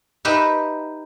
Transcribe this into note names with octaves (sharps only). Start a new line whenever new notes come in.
D#4 G4 B4 E5